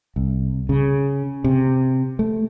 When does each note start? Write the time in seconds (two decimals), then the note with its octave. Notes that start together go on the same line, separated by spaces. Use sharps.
0.16 C2
0.69 C#3
1.44 C3
2.19 A3